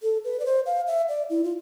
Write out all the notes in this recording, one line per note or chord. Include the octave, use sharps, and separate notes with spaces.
A4
B4
D5
C5
F5
E5
D5
E4
F4